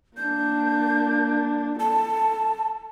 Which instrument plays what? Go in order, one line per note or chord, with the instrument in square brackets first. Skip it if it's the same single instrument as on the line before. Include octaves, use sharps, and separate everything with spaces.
[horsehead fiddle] A#3 D4 [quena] G6
[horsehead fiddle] A4 [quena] A5